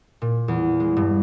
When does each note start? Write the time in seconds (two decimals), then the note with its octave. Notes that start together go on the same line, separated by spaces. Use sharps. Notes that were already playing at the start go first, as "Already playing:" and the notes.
0.22 A#2
0.48 E2
0.80 G#3
0.97 G2